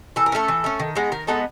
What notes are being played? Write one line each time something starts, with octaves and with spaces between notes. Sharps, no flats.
E3 A4
A#4
A3 C#4 A4
E3
A3 C#4
D#3
G#3 B3 D#4
D#3 A#4
G#3 B3 D#4 A4